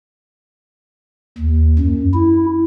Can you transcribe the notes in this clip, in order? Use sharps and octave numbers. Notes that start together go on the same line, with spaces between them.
D#2
F#2
E4